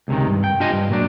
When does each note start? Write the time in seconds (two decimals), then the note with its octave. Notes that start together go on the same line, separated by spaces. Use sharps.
0.08 C#2 C3 D#3
0.27 G2
0.44 G5
0.60 D4 F4 G4 C5 D#5 G#5
0.72 G2
0.90 A#2 F#3 D4